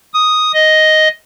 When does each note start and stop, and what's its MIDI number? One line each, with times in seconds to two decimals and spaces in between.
0.14 0.52 87
0.54 1.08 75